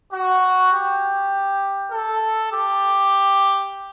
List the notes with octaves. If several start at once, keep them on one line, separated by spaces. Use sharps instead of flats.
F#4
G4
A4
G4